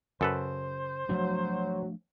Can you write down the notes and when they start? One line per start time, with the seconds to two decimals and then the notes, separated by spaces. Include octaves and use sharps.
0.21 F#2 C#3 A4 B4 C5
1.09 F3 F#3 A3 D4